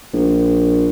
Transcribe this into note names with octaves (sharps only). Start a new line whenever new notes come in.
A#1